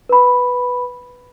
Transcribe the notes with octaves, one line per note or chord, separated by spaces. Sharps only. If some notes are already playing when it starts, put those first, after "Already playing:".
B4 B5